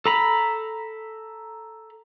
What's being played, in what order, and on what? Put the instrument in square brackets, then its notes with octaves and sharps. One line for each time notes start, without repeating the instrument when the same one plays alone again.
[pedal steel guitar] A4 A#5 B5